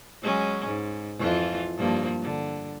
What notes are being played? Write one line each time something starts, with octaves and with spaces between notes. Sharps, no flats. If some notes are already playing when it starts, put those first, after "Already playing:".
F#3 G#3 C#4
G#2
F2 E3 F4
G2 F3 A#3
D3